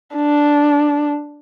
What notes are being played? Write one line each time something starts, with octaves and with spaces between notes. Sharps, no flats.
D4